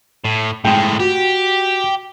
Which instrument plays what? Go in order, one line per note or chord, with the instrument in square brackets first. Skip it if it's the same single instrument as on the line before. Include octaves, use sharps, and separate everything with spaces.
[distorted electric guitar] A2
[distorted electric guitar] A2 G#3 [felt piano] G5
[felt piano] F#4 [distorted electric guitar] G4